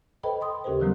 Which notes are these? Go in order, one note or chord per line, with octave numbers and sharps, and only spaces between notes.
A4 B4 C5 D#5 G5 B5
G5 C6 D#6
D#2 C#3 G4 A4 A#4 C5
D#3 E3 F#3 G3 B3 C#4